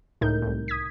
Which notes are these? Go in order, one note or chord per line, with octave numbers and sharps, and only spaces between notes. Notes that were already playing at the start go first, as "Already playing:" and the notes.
C#2 A2 D#4 A#4 G6
C2 A2
D#6 G#6 B6